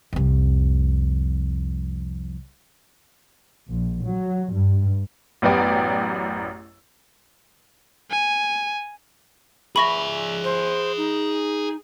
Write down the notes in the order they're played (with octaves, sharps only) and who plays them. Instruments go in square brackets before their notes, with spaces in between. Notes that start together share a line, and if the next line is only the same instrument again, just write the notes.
[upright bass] C2 F2
[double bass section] A#1
F#3
G2
[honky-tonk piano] A1 F#2 B3 G4 D5
[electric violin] G#5
[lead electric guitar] G#4 E5 [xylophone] B5 C#6 A#6
[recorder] C5
D#4